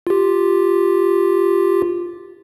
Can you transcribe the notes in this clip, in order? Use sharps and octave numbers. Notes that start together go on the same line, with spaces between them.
F4 G4